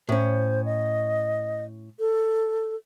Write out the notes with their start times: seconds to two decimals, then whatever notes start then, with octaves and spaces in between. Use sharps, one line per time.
0.09 A2 C#4 C5
0.65 D#5
2.00 A4